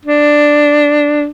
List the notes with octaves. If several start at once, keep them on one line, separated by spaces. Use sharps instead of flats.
D4